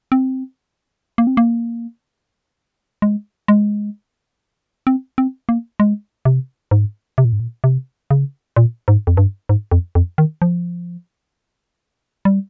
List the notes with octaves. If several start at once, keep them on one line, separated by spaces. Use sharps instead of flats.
C4
A#3
C4
A#3
G#3
G#3
C4
C4
A#3
G#3
C3
G#2
C3
A#2
G#2
A#2
C3
C#3
A#2
G#2
F2
G2
G#2
F2
F2
D#3
F3
G3